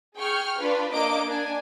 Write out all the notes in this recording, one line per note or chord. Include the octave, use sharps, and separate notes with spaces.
G#4 G5 C#6 F6
D4 F4 B4
A#3 D4 D#5 D6 D7
D4 G#5